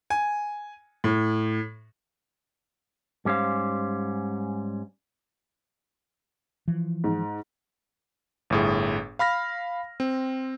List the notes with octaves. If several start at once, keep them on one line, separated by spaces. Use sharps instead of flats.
G#5
A2
G#2 G3 C#4 C5 F5
E3 F3
G#2
G1 A2 G#4
F5 B5 F6 A#6
C4